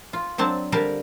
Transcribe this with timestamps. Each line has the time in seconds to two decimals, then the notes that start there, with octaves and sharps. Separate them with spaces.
0.13 F4
0.38 F#3 C4 D4 A5
0.72 D3 G3 G4 A#4 F5 A5